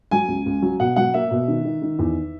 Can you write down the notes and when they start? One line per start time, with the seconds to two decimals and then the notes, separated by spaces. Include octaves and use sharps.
0.11 F#3 G#5
0.28 C#2
0.46 C#2
0.62 F#3
0.80 B2 F#5
0.96 F#3 F#5
1.14 A#3 E5
1.31 B2
1.48 D#3
1.65 D#3
1.82 D#3
1.99 E2